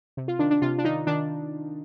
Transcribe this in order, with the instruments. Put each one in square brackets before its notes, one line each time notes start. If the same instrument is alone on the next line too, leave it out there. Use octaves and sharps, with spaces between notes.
[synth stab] C3
F4
D#3 D4
D4
C3 F4
D4
D#3 D#4
D#3 D4